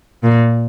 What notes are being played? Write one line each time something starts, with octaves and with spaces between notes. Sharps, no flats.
A#2